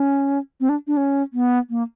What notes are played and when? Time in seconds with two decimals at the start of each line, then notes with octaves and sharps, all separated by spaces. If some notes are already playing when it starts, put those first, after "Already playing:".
Already playing: C#4
0.60 C4
0.69 D4
0.87 D4
0.97 C#4
1.33 B3
1.70 A#3